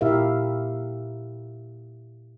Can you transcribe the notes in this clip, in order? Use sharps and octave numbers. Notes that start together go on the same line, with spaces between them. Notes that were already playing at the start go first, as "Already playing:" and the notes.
A#2 E4 G4 A#4 E5 F5